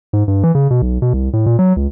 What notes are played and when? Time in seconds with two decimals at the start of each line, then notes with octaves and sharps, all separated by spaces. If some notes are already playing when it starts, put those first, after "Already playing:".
0.13 G#2
0.28 G2
0.43 E3
0.55 C#3
0.70 B2
0.82 B1
1.02 B2
1.13 C2
1.33 A2
1.46 A#2
1.59 F#3
1.76 C#2